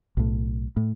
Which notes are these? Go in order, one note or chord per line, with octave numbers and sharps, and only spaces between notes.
B1 A2
A2